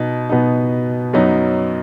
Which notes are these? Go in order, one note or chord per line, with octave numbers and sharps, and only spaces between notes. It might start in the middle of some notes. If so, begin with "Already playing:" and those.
Already playing: B2 B3 D#4
B2 B3 D#4
F#2 F#3 B3 D#4